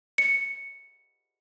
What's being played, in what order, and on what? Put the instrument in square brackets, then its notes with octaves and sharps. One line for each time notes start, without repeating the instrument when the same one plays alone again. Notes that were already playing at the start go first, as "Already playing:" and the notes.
[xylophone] C#7